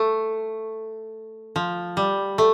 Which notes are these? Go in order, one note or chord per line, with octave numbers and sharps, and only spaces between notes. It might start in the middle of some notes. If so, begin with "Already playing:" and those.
Already playing: A3
F3
G3
A3